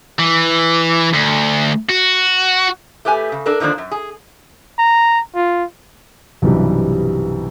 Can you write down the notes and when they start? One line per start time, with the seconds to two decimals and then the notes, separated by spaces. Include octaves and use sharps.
0.19 E3
1.14 D2
1.89 F#4
3.05 A3 G4 B4 G#5
3.32 C#3
3.46 D4 A4 A#4
3.60 D3 D#3 F3 A#3 D4
3.78 F#2
3.92 G#4
4.79 A#5
5.35 F4
6.42 B1 G2 C3 E3 G3